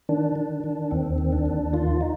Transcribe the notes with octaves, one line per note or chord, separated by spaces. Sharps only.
D#3 D4
D#3
D#3
D#2 C4
D#3
D4
D#2
D#3 F4
D#4